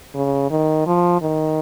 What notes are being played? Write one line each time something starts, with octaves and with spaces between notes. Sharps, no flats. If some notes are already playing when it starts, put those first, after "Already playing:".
C#3
D#3
F3
D#3